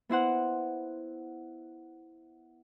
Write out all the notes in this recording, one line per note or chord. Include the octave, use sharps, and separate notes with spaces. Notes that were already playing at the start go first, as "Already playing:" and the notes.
B3 E4 C5 F#5